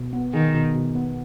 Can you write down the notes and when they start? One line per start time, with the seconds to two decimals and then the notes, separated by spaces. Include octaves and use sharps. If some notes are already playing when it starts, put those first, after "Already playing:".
Already playing: B2
0.13 B3
0.33 D#3 G#4
0.54 B2
0.75 B2
0.95 B3